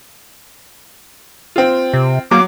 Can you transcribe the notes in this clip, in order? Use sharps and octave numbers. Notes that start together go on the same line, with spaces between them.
C4 F4
C3
F#3 A#3 D6